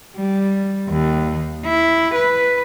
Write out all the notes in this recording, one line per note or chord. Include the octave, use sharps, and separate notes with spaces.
G3
D#2
E4
B4